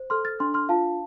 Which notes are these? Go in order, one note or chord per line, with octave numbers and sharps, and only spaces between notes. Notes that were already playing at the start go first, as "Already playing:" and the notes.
Already playing: C5
A4 C6 F6
F6 A6
D4 C6 F6
C6 F6
F4 F5 A5